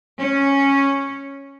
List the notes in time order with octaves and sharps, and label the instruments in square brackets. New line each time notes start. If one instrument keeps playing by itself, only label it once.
[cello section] C#4